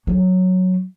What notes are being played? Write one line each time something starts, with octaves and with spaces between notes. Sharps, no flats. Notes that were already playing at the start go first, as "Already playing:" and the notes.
F#3